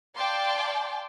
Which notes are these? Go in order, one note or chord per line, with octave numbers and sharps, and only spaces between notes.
D5 F5 G5 A5 C6 D6